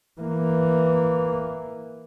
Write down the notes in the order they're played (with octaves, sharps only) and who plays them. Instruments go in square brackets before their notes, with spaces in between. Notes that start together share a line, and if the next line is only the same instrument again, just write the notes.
[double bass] E3 A#3